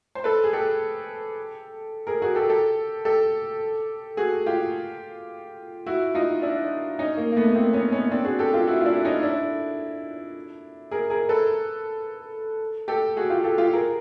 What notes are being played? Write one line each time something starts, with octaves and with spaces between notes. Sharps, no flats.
C5
A4 B4
G#4
G4 A4
G#4 A#4
F#4 G#4
G4 A4
G4 A4
G4 A4
F#4 G#4
F4 G4
E4 F#4
D#4 F4
D4 E4
C#4 D#4
A#3
A#3
A3 B3
A#3 C4
B3 C#4
B3 C#4
C4 D4
F#4 G#4
G4 A4
F4 G4
E4 F#4
F4
D4 E4
C#4 D#4
D4 E4
G#4 A#4
G#4 A#4
A4 B4
G4 A4
F#4 G#4
F4 G4
G4 A4
F4 G4
G#4 A#4